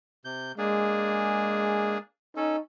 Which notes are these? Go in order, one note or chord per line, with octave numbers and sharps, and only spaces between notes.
C3 G6
G#3 A#3 D4 G#4
C#4 D#4 A4